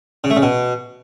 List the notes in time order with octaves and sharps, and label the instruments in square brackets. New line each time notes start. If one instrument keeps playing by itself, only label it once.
[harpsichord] C#3
A3
C#3
B2